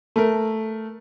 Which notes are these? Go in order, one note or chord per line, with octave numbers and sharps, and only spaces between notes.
A3 A#4